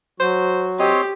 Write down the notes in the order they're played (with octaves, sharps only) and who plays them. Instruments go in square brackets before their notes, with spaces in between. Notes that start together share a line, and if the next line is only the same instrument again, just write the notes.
[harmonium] F#3 F#4 [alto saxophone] C5
[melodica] C4 C#5 C6 [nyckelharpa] G4 [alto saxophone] D#5